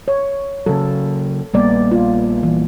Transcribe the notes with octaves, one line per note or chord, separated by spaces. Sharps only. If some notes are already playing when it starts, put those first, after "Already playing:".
C#5
C#3 F#3 A4
A#1 G3 A#3 B3 D5
F4
E3